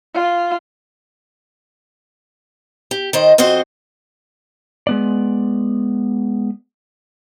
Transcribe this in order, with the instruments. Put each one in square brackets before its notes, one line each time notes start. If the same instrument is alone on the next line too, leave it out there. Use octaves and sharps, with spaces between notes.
[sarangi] F4
[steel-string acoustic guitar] G4
D#3 C5 D#5
F2 C4 F#4 C5 D#5
[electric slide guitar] G#3 B3 D5